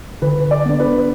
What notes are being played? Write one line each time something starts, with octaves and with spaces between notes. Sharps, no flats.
D3 B4
D5
B3 D4
B4